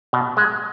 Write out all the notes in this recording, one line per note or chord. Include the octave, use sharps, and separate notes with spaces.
B2
G#3